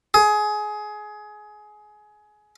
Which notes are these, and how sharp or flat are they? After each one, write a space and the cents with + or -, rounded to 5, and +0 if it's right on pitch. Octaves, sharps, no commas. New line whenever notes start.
G#4 +20